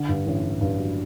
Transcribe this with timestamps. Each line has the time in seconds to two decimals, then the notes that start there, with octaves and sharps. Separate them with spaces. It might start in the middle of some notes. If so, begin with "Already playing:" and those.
Already playing: D3
0.09 G2
0.26 A1
0.43 G2
0.61 G2
0.79 F#3